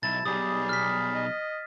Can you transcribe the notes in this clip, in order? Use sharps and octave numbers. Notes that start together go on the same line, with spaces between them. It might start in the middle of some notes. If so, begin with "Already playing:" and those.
B1 E4 A5 A6
B1 B2 G3 G4 G#4 D#6
F6 B6
D#5